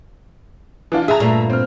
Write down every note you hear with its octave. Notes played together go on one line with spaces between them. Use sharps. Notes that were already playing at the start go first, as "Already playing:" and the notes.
E3 D4 F4
G#4 E5 A5 A#5
G2 A#2 A3
C4 F6